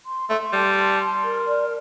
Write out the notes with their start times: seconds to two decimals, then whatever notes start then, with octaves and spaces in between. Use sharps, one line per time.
0.07 C6
0.30 A3 C6
0.53 G3 A5
0.76 C6
1.00 C6
1.22 A#4
1.46 D5